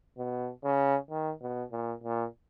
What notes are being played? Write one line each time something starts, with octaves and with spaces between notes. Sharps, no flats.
B2
C#3
D#3
B2
A#2
A#2